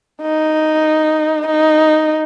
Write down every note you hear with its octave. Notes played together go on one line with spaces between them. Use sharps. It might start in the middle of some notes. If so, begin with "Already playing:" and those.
D#4
D#4